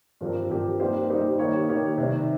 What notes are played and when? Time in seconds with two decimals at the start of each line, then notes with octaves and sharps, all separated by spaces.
0.21 G2 F3 C4 G4 A#4
0.50 G2 F3 C4 G4 A#4
0.80 G3 A#3 D#4 G4 C5
1.10 G3 A#3 D#4 G4 C5
1.39 D#3 A#3 D#4 G4 C#5
1.69 D#3 A#3 D#4 G4 C#5
1.98 C3 D#3 G3